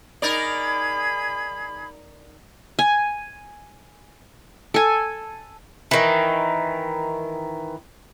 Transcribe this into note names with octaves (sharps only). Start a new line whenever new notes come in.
D#4 G#4 A#4 D5 B5 G#6
G#5
A4 G#5
D#3 E3